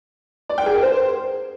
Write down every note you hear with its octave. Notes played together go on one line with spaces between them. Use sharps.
D5
G5
G#4
A#4
C5